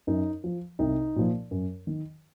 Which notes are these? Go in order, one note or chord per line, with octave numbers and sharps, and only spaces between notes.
F#2 D#4
F3
C2 D#4
A#2 F3
F#2
D#3